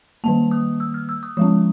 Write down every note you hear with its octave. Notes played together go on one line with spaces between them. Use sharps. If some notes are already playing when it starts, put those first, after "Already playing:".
D#3 G3 A#3 A5
D#6
E6
F6
E6
D#6
F3 G#3 C#4 D#6